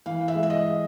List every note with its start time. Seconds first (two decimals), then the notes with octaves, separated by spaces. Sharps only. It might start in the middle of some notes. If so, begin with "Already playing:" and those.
0.06 E3 F5
0.28 E5
0.35 G#3
0.43 E5
0.50 D#5